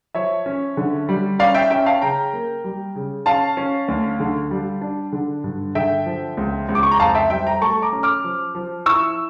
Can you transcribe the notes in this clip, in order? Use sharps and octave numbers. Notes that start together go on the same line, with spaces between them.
F3 C#5 E5
C#4
D3
G3
C#4 D5 F5
E5 G5
C#4 E5 G5
F5 A5
C#3 G5 A#5
A#3
G3
C#3
C#4 F5 A5
C#4
D2
D3
G3
D4
D3
G2
D3 E5 G5
F3
C#2
C#2
D6
C#6
A#5
F2 F5 A5
E5 G5
G3 E5 G5
G5 A#5
A3 A5 C#6
A#5 D6
C#4
D6 F6
F3
F3
E4 C#6 E6